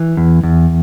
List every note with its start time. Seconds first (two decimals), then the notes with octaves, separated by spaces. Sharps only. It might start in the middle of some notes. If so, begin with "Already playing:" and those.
Already playing: E3
0.17 E2
0.43 E2